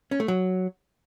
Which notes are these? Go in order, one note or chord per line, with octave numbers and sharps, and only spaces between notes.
C#4
A3
F#3